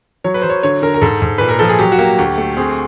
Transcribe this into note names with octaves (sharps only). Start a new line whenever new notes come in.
F#3 C#5
B4
F#3 C5
C#5
D3 C#5
D3 A#4
A#4
G#2 A4
G#2
A#2 B4
A#4
F3 A4
G#4
F#3 G4
F#4
A#3 G4
D2
A3
C4 G#4